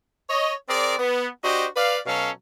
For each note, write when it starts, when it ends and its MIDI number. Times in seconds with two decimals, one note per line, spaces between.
0.29 0.54 73
0.29 0.54 75
0.69 0.96 60
0.69 0.96 68
0.69 0.96 70
0.69 0.96 74
0.98 1.27 59
1.43 1.66 62
1.43 1.66 66
1.43 1.66 67
1.43 1.66 72
1.43 1.66 75
1.76 1.98 71
1.76 1.98 74
1.76 1.98 77
2.06 2.30 47
2.06 2.30 54
2.06 2.30 61
2.06 2.30 69
2.06 2.30 77